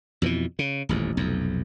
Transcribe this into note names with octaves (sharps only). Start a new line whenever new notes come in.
F2 B2 D#3 E3
C#3
D#1 A1 F2
F1 B1 F2